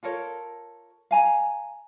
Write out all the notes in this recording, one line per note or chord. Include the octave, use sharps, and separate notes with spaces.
F4 A4 A#4 C#5
F5 G#5 A#5